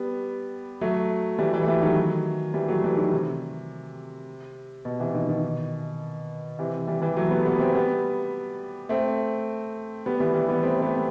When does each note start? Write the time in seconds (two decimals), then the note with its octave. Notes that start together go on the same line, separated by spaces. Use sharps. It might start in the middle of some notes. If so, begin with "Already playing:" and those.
Already playing: G3 B3
0.81 F#3 A3
1.39 E3 G3
1.53 E3 G3
1.62 A3
1.68 E3 G3
1.82 D#3 F#3
2.54 E3 G3
2.68 F#3 A3
2.84 E3 G3
2.97 D#3 F#3
3.12 C3
4.85 B2
5.00 C3 E3
5.14 B2 D#3
5.29 B2 D#3
6.59 C3 E3
6.87 E3 G3
7.02 E3 G3
7.17 F#3 A3
7.31 G3 B3
7.45 G3 B3
7.59 A3 C4
7.75 G3 B3
8.89 A3 C4
10.06 G3 B3
10.20 E3 G3
10.34 E3 G3
10.49 G3 B3
10.63 A3 C4
10.78 A3
10.82 G3 B3